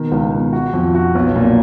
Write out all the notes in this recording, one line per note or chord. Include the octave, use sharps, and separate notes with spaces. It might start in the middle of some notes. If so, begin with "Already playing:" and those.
Already playing: B2 D#3
C#2
B2
F#4
F2
F#4
B1
A#2